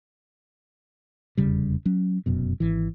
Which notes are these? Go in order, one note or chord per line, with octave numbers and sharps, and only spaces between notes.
F1 E2 C#3 G3
F#3 C#4
F1 F#2 B2
G#1 E3